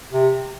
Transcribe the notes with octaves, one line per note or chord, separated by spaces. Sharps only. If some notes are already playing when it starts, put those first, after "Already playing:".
C3